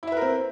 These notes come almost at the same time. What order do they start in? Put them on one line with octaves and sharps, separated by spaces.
E4 E5 B4 A#4 C4